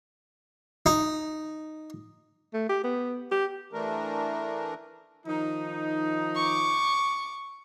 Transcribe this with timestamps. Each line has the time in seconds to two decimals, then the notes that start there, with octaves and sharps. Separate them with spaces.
0.86 D#4
2.54 A3
2.69 G4
2.84 B3
3.32 G4
3.73 E3 A3 D4 A#4
5.27 D#3 F3 D#4
6.35 C#6 D6